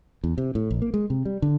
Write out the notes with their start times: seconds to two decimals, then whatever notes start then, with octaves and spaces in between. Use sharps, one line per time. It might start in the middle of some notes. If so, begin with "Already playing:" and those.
0.24 E2
0.38 C3
0.55 A2
0.71 A#1
0.82 A#3
0.94 G#3
1.10 C3
1.25 G3
1.42 D3